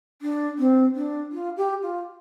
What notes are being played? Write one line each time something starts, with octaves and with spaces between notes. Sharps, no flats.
D4
C4
D4
F4
G4
F4